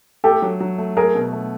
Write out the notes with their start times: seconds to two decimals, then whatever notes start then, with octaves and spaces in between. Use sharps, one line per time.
0.24 A3 G4 A4
0.42 F#3
0.60 F#3
0.78 A3
0.97 A3 G#4 A#4
1.15 B2
1.33 A3